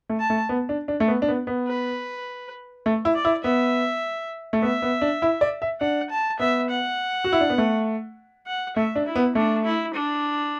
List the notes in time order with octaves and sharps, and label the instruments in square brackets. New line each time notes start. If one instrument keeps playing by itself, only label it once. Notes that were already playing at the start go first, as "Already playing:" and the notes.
[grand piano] A3
[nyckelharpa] A5
[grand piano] A3
B3
D4
D4
A3
B3
D4
B3
B3
[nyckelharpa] B4
[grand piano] A3
E4
[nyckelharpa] D5
[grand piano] E4
[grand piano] B3 [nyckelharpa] E5
[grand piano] A3
[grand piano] B3 [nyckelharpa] E5
[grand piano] B3
D4
E4
D5
E5
[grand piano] D4 [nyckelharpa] F#5
[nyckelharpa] A5
[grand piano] B3 [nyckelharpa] E5
[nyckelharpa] F#5
[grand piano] F#4
E4
D4
B3
A3
[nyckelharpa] F#5
[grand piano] A3 [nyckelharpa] E5
[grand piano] D4
[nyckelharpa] E4
[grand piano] B3
[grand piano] A3 [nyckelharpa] D4
[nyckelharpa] E4
D4